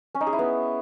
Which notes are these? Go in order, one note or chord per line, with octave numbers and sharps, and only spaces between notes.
C#4
D#4
G#4
E4
B3